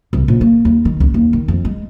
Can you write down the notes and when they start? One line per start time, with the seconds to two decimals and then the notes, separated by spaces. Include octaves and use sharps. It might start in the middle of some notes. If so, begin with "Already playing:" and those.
0.13 C2
0.28 A#1
0.41 A#3
0.65 D#2
0.85 D#3
1.00 C#2
1.14 D#2
1.33 D#3
1.48 F2
1.65 G#3